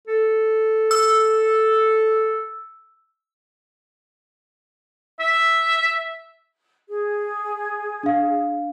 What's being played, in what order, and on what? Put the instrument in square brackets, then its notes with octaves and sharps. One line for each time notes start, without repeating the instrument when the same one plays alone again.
[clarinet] A4
[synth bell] E6
[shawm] E5
[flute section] G#4
[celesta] D4 F5